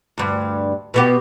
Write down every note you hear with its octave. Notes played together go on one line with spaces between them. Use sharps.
D2 G2
B2 B3 G4